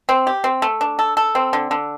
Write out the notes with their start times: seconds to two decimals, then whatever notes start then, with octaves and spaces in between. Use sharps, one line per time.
0.09 C4
0.27 G4
0.44 C4
0.62 A3
0.81 D4
0.99 A4
1.17 A4
1.35 C4
1.53 D3
1.71 D3